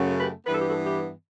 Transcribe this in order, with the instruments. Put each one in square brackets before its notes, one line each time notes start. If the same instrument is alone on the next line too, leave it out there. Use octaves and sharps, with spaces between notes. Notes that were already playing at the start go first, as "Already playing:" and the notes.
Already playing: [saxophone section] F#2 C#3 F#3 A3 C#4
G4 B4
G2 E3 B3 B4
A4
G4
F#4 A4
E4 G4